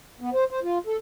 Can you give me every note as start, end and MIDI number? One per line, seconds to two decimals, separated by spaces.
0.21 0.30 59
0.33 0.44 72
0.51 0.60 72
0.63 0.78 65
0.87 0.97 69